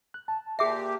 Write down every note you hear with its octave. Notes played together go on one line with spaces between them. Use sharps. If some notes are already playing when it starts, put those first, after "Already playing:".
F#6
A5
A#2 G4 G#4 E5 D6 C7